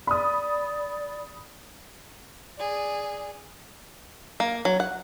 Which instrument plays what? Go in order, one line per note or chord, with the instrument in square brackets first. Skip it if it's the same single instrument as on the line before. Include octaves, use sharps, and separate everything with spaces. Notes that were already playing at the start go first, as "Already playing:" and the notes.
[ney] D5 [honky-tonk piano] B5 D#6
[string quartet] G#4 D5
[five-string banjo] A#3
F#3
F#5